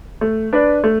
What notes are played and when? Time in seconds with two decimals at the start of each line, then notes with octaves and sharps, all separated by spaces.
0.21 A3
0.53 D4 B4 D5
0.84 A3